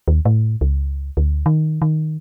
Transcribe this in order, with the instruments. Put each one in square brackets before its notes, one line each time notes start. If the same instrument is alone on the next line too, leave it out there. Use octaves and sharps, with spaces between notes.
[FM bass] D#2
A2
C#2
D2
D#3
D#3